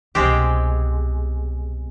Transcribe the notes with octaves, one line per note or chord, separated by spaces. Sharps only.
C2 B2 G#3 C4 G4